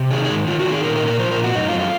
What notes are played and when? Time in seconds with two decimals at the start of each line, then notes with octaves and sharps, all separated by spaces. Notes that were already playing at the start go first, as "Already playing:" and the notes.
Already playing: C3
0.11 D#3 G#4
0.24 G#4
0.30 G#2
0.47 D#3 F4
0.59 F#4
0.66 D#3
0.72 G#4
0.83 A#2 A#4
0.96 A#4
1.02 A#2
1.07 A#4
1.19 F3 C5
1.31 A#4
1.37 A#2
1.44 F#4
1.55 F#2 D#4
1.68 F4
1.73 F#2
1.79 F4